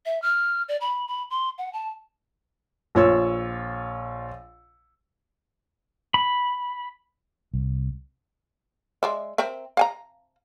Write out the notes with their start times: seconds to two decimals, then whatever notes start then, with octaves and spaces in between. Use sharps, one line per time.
0.06 E5
0.22 F6
0.69 D5
0.81 B5
1.08 B5
1.30 C6
1.58 F#5
1.73 A5
2.95 A#1 F4 C#5 E6
6.14 B5
7.54 C2
9.03 G#3 D5 E5
9.38 C4 A#4 E5
9.77 F5 G#5 A#5